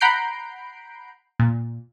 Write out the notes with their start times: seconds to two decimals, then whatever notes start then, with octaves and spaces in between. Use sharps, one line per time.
0.01 F#5 A#5 B5 G6 C7 D7
1.39 A#2